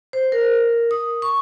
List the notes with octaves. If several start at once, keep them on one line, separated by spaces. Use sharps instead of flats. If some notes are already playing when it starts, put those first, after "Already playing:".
C5
A#4
D#6
C#6